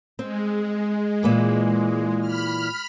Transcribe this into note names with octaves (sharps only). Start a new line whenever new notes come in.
G#3 C4
A#2 E3 A#3
B5 F6